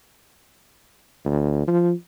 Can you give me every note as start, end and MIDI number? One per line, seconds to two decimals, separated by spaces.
1.25 1.66 38
1.68 1.92 53